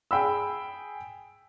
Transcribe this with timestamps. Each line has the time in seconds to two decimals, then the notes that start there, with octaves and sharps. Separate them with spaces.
0.11 G#4 G5 B5 E6